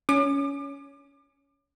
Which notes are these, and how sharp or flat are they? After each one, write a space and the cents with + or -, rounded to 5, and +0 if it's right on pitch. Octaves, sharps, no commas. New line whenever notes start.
C#4 +20 D6 +40